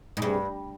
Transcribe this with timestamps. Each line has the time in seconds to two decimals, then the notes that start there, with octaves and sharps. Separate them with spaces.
0.17 G#2
0.22 G2 C3 G3 D4 G#4